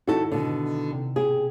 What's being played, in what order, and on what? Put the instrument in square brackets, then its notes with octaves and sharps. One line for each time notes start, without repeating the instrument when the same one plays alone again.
[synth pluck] D#3 D#4 E4 [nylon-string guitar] F#4 A4
[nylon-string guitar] B2 D3
[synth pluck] C3
[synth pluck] B2 G4 [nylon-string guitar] G#4